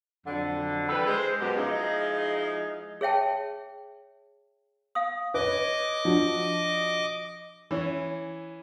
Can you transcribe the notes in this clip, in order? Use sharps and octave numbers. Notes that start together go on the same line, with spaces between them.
F2 D3 F#3
E3 G3 A4 B4
G#3 C5
F#2 B2 G4
F3 G#3 D#4 E4 D#5 F5
G#4 C#5 E5 G5 A5
F5 D#6
B4 C#5 D#5 D6
F3 D4 F#4
E3 C#4